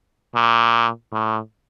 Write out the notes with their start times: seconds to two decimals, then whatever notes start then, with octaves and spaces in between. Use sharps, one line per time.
0.35 A#2
1.12 A2